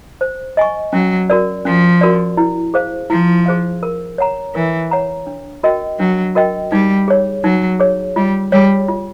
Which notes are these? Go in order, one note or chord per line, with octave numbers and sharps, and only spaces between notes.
C5
D#5 G#5 C#6
F#3 C#4
F#4 A#4 D5
F3 C#4
F#4 A#4 D5
E4
G#4 C5 F5
F3 E4
G#4 C5 F5
A#4
C#5 F#5 A#5
E3 A#4
C#5 F#5 A#5
D4
F#4 A#4 D#5 G5
F#3 D4
F#4 A#4 D#5 G5
G3 D#4
G#4 C#5
F#3 D#4
G#4 C#5
G3 F4
G3 G#4 C#5
F4